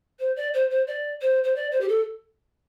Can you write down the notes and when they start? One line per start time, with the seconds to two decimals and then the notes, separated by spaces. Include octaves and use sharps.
0.19 C5
0.36 D5
0.54 C5
0.70 C5
0.87 D5
1.21 C5
1.44 C5
1.55 D5
1.72 C5
1.81 G4
1.88 A4